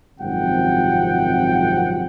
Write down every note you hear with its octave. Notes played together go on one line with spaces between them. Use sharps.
G#1 F#2 C3 F3 F#5 G5